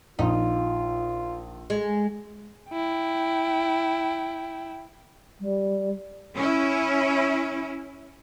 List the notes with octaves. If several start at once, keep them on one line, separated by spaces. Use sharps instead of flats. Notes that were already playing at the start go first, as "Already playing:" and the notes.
A#1 D#4 F4
G#3
E4 G5
G3
C#4 E4